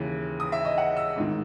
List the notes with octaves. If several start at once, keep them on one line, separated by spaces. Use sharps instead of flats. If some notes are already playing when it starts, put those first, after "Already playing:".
Already playing: D#2 C#3 E3
D#6
E5
D#5
F#5
E6
A1 G#2 D#3